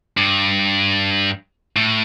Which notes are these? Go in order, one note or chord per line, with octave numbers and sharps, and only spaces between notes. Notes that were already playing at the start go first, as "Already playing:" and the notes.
G2
A2